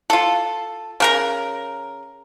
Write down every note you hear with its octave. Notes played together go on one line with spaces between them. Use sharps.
F4 A4
C#3 A#4 A#5